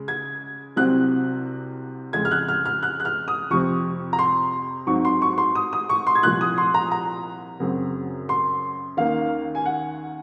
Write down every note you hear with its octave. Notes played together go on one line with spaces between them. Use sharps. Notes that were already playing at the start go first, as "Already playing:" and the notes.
Already playing: C#3 G#3
G#6
C2 C3 F#3 C4 F#6
F2 C#3 G#3 G#6
F6
F#6
F6
F6
F#6
F#6
F6
D#6
F2 C3 F3 C4 C#6
A#5
C6
G#2 F#3 C4 C#6
C6
C#6
C6
D#6
D#6
C#6
C6
G#6
C2 A#2 F3 F#6
D#6
C6
A#5
A#5
F#2 C#3 F#3 C4
C6
D#2 D#3 A#3 C#4 F5
G#5
F#5